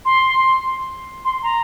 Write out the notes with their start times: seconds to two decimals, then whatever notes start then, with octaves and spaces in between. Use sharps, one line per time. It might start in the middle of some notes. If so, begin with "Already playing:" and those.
0.05 C6
1.25 C6
1.43 A#5